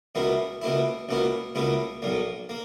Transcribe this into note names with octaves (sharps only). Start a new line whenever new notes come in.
C#2 B2 A#3 E4
C#2 B2 A#3 E4
C#2 B2 A#3 E4
C#2 B2 A#3 E4
B1 A#2 A#3
A#3